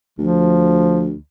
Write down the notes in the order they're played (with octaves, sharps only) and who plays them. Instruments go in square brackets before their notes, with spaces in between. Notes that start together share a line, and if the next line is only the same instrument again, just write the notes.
[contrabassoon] D2 [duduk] F3